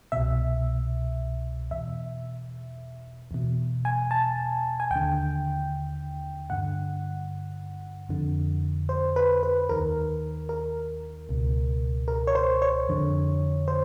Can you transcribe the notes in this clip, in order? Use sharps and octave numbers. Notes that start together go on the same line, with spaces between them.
C2 B2 E5
E2 B2 E5
E2 B2
G#5
A5
G#5
D#2 D3 G5
G2 D3 F#5
F2 D3
C5
B4
B4
D#2 D#3 A#4
A#4
C#2 B2
A#4
C#5
C5
C#5
F2 D3
C5